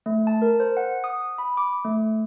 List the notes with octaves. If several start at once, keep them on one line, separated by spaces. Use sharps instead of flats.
A3
A5
A#4
C5
F#5
D#6
B5
D6
A3